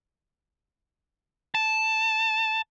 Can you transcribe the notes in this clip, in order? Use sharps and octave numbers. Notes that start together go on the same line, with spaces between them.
A5